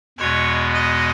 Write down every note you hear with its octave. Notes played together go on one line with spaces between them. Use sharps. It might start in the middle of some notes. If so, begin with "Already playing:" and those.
E2 B2 G#3 B3 C#5
D#5